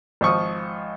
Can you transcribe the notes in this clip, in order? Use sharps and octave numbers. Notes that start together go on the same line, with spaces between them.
G#1 F3 C#6 D#6